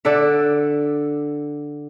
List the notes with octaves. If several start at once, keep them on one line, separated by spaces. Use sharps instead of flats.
D3 D4 A4 E5